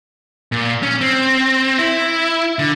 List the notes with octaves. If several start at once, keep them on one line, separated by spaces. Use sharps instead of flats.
A#2
C#4
C4
E4
D3